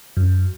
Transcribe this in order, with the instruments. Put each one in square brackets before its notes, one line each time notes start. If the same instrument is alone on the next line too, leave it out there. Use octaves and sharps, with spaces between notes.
[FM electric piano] F#2